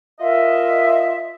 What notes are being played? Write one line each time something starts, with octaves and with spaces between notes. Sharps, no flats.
F4 A#4 D#5 E5